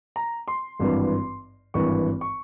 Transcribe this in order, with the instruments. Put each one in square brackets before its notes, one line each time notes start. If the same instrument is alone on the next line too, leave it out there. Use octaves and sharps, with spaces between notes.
[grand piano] A#5
C6
G#1 G2 E3
G#1 G2 E3 C#6
C#6